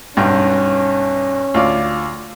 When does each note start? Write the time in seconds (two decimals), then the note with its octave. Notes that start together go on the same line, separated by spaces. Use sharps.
0.17 B1 G2 C#4 G5
1.54 D2 F4 D5